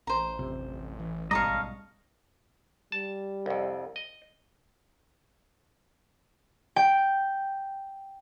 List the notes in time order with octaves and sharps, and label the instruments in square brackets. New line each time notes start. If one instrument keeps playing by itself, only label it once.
[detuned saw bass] A1 [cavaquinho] C5 A#5
[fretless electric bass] D1 F2 C3
E3
[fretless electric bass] B1 G#2 G3 [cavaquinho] C#5 A5 A#5 [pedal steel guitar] D#5 F5
[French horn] G3 [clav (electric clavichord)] A5
[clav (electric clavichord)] C2 F2
D#5
[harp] G5